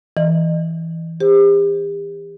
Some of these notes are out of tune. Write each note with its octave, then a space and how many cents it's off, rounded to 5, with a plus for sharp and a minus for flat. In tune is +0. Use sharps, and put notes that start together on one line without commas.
E3 -5 D#5 -35
G4 +40 C5 +0